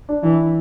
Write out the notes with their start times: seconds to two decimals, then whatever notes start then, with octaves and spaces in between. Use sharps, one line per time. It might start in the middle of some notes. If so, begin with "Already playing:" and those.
0.09 D4
0.23 E3 E4